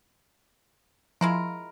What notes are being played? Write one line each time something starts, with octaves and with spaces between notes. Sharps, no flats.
F3 G#3 E4 A#4